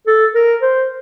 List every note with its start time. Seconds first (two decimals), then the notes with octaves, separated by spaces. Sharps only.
0.07 A4
0.35 A#4
0.62 C5